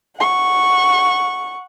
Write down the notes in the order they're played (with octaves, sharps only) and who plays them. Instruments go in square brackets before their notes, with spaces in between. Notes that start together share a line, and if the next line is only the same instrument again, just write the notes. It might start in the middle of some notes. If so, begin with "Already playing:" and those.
[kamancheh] F#5 C#6